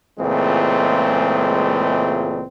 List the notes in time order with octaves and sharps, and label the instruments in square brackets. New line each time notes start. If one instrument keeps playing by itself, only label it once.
[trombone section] C#2 A#2 E3 G#3 A3 C4